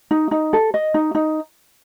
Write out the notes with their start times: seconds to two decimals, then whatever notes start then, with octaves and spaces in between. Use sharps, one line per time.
0.11 D#4
0.31 D#4
0.53 A4
0.74 D#5
0.94 D#4
1.15 D#4